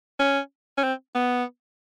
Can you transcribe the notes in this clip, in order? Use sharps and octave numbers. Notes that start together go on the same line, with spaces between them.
C#4
C#4
C4
B3